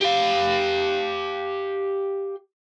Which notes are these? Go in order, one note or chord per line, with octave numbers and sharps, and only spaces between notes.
G4 F5